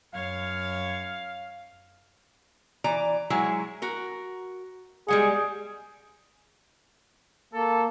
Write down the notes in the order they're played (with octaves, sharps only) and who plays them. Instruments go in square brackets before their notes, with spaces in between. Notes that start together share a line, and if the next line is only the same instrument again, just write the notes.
[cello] F#2 C#5 [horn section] F5
[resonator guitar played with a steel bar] E3 D5 A#5
F#3 G#3 E4
F#4 A#4
[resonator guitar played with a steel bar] G3 G#3 F#5 [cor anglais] G#4
[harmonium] A#3 [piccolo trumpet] A4